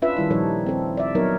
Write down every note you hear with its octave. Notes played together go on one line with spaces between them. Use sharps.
C#4 D4 F4 B4 E5
D#3 G3 E4
A#2 F3 G3 D#4 A4 C#5
C4 A4
D5 E5
F#3 B3 D#4 A#4 C#5